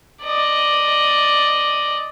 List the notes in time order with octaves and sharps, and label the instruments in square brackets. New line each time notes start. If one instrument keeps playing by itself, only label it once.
[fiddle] D5 D#5